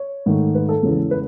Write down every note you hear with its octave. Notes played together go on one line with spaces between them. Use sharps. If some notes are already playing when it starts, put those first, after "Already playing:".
Already playing: C#5
G#2 D#3 A3
B4
A4
E2 C#3 G#3
B4